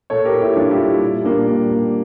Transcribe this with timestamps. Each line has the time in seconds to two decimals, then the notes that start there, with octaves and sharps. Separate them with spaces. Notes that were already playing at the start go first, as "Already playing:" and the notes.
0.10 A#2 A4 C#5
0.25 G4 A#4
0.34 A#2
0.41 E4 G4
0.56 G3 D4 F4
0.71 E4 G4
0.79 G3
1.01 A#2
1.24 A#2 A#3 D4
1.48 G3
1.71 G3